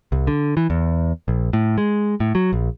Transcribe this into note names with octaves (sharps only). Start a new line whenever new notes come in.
C2
D3
E3
E2
A#1
A2
G#3
A2
F#3
A#1